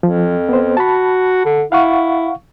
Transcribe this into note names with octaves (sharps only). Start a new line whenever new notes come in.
F2 F3
B3 C5
F#4 A5 B5
D3
E4 F5 F#5 C#6